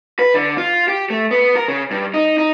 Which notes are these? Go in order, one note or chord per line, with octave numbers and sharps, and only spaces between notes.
B4
D3
F4
G4
A3
B3
A#4
C#3
G2
D#4
D#4